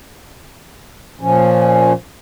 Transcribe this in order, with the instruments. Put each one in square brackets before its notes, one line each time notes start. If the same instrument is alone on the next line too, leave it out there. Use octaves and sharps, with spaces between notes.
[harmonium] A#2 F3 C#4